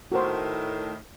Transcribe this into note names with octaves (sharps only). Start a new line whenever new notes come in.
A2 D#3 F#4 A#4 C5